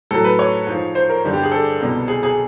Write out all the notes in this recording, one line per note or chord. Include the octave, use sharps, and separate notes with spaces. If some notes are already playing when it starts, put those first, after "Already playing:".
A2 F#3 A4
B4
C#5
G#2 F3
C5
A#4
G2 D3 G3
G4
G#4
A4
C2 B2 G3
G#4
G#4